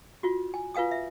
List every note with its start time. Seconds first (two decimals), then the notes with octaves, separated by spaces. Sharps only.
0.23 F4 F#4
0.54 G#5
0.74 F4 B4 F5 G#5 D#6
0.91 E5